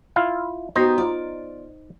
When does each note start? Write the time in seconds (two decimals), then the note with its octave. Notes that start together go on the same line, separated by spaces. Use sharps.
0.16 E4 F4 F5
0.75 B3 D#4 F#4 G4 C5 A#5
0.98 F4 D5